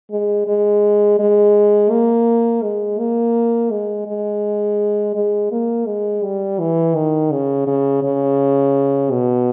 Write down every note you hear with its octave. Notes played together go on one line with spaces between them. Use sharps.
G#3
G#3
G#3
A#3
G#3
A#3
G#3
G#3
G#3
A#3
G#3
G3
E3
D#3
C#3
C#3
C#3
B2